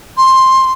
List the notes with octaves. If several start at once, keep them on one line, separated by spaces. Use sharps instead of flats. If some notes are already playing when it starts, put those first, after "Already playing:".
C6